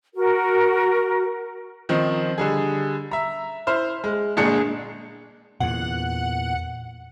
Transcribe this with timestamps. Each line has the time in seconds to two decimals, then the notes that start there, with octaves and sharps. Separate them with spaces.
0.15 F#4 A#4
1.89 D#3 F3 C4 D#4
2.38 D3 G3 G#4
3.11 E5 A#5
3.67 E4 C5 F6
4.04 G#3
4.37 G1 A#2 G#3 D4 G#4 C#7
5.60 E2 A#2 F#5